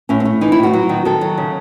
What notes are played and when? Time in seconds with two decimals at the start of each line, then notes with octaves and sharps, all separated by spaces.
0.09 A2 C#4
0.20 C4
0.25 A3
0.41 E3 D#4
0.52 E4
0.58 A2
0.63 F#4
0.73 F#3
0.89 D#3
1.05 D#3 A4
1.21 F#3
1.38 C#3